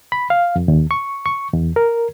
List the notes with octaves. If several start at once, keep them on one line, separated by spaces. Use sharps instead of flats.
B5
F5
F2
D#2
C#6
C#6
E2
A#4